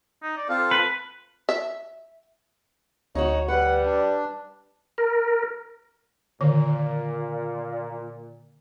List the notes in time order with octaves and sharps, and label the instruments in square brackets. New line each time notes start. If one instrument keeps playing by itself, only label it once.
[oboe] D#4
D5
[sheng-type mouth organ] C4 F4 A4 [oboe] F5
[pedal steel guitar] B4
[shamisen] E5
[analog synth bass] D2 [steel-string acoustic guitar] D#4 F#4 [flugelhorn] C#5
[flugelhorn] G3 [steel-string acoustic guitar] B4 [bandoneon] F#5
[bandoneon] D4
[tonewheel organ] A#4
[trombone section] A#2 [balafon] D3 D#3